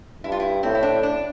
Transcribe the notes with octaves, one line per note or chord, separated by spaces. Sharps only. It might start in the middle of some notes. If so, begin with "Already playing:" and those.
G2 E4
F4
E4
A2 C4
E4
D4
D4